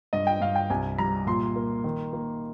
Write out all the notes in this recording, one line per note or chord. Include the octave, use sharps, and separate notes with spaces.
G2 D#5
G5
G2 F5
G5
C2 G#5
G3 A#5
A#2 C6
A#3
D#3
A#3